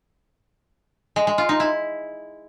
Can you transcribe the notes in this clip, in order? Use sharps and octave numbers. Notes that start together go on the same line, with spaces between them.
G#3
G#3
F4
D#4
E4